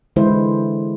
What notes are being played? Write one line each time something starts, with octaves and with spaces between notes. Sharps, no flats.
D3 E3 G#3 E4 C5